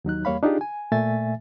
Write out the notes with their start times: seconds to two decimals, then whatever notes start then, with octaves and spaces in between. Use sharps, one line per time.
0.05 D#2 F#3 D#4 F#6
0.25 E2 G3 A#3 C#5 F5 B5
0.43 D4 D#4 F4 G4 G#4
0.61 G#5
0.92 A#2 A3 E5 G#5 A6